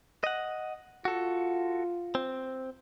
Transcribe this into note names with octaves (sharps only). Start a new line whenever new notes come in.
D#5 F#5
F4 F#4 A4
C4